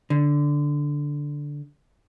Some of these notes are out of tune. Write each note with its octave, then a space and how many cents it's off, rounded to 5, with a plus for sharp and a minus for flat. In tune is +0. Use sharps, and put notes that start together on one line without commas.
D3 -5